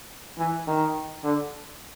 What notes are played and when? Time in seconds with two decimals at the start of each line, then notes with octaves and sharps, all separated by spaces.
0.38 E3
0.67 D#3
1.24 D3